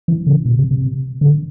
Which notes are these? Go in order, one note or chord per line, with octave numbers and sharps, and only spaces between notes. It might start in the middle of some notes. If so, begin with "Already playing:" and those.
E3
C#3
B2
C3
C3
D3